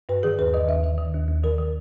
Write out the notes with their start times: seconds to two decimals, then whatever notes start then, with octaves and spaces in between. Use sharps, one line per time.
0.09 G2 B4
0.23 D#3 G#4
0.39 D#2 B4
0.54 D#3 D#5
0.68 D#2 E5
0.84 D#3 E5
0.98 D#3
1.14 D#2
1.28 D#2
1.43 D#3 A#4
1.58 D#3